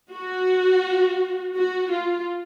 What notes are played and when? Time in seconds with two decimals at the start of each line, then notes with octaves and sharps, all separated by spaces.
0.13 F#4
1.55 F#4
1.91 F4